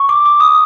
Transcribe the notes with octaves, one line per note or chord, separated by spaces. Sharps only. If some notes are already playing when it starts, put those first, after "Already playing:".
Already playing: C#6
D6
D6
D#6